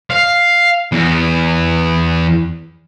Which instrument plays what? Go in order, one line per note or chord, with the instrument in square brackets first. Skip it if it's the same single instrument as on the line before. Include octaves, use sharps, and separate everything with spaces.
[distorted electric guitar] F5
E2